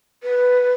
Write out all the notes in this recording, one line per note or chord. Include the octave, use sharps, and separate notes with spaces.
B4